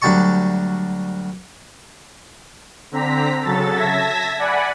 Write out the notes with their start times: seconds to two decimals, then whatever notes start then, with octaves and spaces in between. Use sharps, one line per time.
0.02 D2 F#3 G3 G5 A5 C#6
2.91 D3 C4 A#5 B6
3.42 C#3 F#3 A4 A6
3.76 E5 A5 G#6 A#6 B6
4.38 D5 F#5 G#5 B5